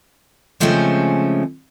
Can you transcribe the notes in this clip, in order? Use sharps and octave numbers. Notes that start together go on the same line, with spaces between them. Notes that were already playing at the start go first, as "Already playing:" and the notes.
C#3 F3 G#3 A3 C4 C#4